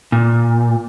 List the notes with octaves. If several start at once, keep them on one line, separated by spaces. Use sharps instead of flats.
A#2